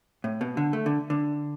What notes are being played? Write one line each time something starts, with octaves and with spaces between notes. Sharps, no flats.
A2
B2
D3
A3
D3
D3